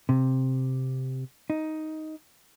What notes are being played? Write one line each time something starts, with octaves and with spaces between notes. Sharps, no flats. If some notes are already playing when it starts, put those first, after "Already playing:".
C3
D#4